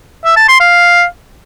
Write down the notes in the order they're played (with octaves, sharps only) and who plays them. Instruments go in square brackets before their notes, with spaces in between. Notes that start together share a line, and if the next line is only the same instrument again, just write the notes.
[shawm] E5
A5
C6
F5